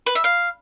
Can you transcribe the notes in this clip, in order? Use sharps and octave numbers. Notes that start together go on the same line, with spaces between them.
B4
E5
F5